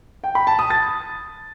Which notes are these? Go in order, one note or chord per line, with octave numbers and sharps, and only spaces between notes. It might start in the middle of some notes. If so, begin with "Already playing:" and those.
G5
B5
A5
D#6
A6